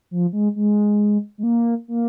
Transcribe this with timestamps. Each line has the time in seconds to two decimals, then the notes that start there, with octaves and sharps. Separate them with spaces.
0.11 F3
0.33 G#3
0.56 G#3
1.38 G#3
1.43 A#3
1.88 A#3